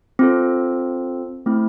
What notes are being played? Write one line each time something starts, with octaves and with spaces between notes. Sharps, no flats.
C4 F4 A4
A3 C4 E4